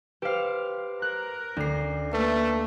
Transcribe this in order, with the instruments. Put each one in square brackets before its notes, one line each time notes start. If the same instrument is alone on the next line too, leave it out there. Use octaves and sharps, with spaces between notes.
[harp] G4 F5 [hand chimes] B4 C5
[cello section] A#4 [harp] F#6
[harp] D2 [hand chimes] C#4 C7
[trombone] A3 [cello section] A#3 [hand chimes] B4